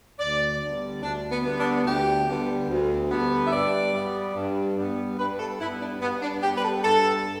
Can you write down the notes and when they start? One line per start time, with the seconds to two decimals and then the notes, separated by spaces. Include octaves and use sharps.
0.19 D2 D5
0.61 D3 G3 B3
1.02 D2 D4
1.30 B3
1.44 D3 G3 B3
1.58 D4
1.86 D2 G4
2.27 D3 G3 B3
2.69 D2
3.10 D3 G3 B3
3.46 E5
3.52 G2 D5
3.94 G3 B3
4.35 G2
4.77 G3 B3
5.18 G2 B4
5.39 A4
5.60 G3 B3 E4
5.81 D4
6.02 G2 B3
6.22 D4
6.43 G3 B3 G4
6.56 B4
6.64 A4
6.84 G2 A4